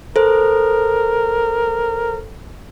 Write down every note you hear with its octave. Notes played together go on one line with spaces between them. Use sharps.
A4 A#4 C5